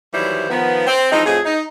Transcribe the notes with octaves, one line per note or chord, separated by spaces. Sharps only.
D#2 E3 F#3 G3 E4 C5
D#3 F3 B3
C4
E3 F3 G#3 D#4
F2 A2 F3 G#4
D#4